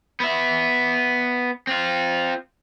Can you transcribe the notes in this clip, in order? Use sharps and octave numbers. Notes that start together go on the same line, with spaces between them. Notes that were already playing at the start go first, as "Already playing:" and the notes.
B3 E5
C4 F4